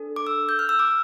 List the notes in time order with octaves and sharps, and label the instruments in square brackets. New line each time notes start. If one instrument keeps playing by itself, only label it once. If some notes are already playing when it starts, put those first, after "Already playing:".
Already playing: [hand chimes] D4 A4
D6
E6
G6
F6
E6
D6